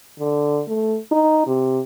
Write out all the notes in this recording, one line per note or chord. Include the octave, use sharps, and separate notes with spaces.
D3
A3
D#4
C3